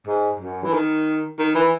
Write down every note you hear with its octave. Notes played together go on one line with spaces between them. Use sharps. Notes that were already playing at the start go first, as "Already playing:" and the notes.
G#2
F#2
E3
D#3
D#3
E3